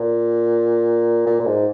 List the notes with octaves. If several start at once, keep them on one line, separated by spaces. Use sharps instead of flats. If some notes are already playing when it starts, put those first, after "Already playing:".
Already playing: A#2
A#2
A#2
G#2